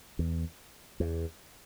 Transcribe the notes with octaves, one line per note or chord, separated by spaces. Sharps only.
E2
E2